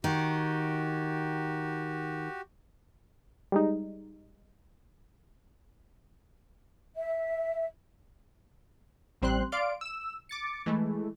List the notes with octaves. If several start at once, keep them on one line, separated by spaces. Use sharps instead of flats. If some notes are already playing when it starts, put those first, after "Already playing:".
D#3 F#4 G4
G3 G#3 D#4
E5
A1 G3 C4 C5 C6 F#6
D5 F5 C6 D7
E6 E7
D6 A6 C#7
E3 G#3 A3